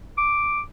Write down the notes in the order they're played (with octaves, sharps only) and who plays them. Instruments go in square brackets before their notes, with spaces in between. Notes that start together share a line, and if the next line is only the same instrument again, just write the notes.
[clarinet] D6